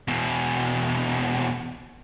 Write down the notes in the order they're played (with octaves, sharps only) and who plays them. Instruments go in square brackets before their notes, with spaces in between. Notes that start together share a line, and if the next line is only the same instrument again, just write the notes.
[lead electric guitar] E2 B2